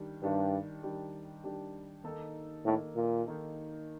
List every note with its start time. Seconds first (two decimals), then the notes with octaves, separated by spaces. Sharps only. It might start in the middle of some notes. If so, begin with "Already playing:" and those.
Already playing: D#3 G3 D4 G4
0.22 G2 D#3 G3 D4 G4
0.83 D#3 G3 D4 G4
1.44 D#3 G3 D4 G4
2.04 D#3 A#3 D#4 A4
2.64 A2 D#3 A#3 D#4 A4
2.95 A#2
3.25 D#3 A#3 D#4 A4